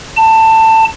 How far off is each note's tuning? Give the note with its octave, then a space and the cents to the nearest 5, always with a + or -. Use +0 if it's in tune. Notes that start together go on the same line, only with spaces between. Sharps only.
A5 +20